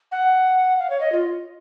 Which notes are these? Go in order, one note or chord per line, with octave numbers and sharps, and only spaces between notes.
F#5
F5
C#5
D#5
F4